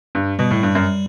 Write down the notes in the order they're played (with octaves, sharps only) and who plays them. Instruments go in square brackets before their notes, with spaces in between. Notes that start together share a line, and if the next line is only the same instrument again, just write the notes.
[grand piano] G2
[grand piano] B2 [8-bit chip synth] G3
[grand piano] A2
G2
F#2